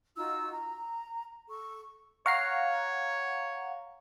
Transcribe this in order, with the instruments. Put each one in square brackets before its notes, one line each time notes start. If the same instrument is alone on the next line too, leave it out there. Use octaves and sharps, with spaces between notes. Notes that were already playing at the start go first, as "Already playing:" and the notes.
[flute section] D#4 F4 F#4 E6
A#5
A4 C#6
[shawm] C#5 [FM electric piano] F5 F#5 A#5 [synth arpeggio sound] C#6 C7